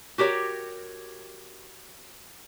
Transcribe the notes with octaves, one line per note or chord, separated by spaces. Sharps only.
F#4 G4 A#4 C#5